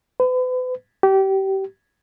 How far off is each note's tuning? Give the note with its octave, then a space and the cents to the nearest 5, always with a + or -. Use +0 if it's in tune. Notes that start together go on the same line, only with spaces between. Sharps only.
B4 +40
G4 -25